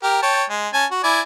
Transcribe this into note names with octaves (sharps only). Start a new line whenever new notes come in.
G4 A#4
C#5 G5 A5
G#3
C#4 G#5 A5
F#4
E4 D5 G#5